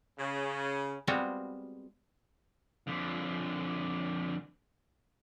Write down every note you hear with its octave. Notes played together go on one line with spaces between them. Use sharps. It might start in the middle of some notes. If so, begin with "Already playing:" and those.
C#3
G3 G#3 B3 C4 F4 F#4
F2 D3